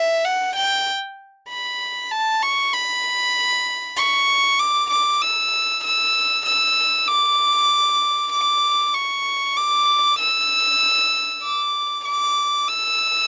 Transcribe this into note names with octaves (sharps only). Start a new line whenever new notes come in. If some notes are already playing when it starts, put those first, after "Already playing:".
Already playing: E5
F#5
G5
B5
A5
C#6
B5
C#6
D6
D6
E6
E6
E6
D6
D6
C#6
D6
E6
D6
D6
E6